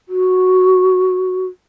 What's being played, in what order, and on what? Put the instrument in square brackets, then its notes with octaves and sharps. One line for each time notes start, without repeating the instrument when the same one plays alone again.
[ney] F#4